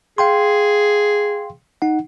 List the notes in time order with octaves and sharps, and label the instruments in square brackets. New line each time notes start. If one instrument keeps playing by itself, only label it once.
[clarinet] G#4 [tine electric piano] F5 G5 C6
[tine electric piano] D#4 F#5